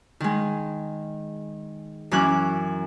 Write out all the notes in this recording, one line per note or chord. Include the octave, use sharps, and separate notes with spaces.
D#3 G#3
F#2 E3 C#4 D6 F#6